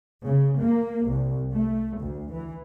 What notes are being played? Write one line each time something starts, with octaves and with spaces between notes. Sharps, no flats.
C#3
A#3
C2
A3
D2
E3